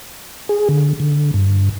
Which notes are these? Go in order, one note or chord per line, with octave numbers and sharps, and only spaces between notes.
G#4
D3
D3
G2